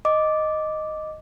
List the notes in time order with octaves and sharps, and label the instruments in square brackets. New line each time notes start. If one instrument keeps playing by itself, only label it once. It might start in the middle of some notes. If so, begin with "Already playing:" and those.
[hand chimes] D#5 D6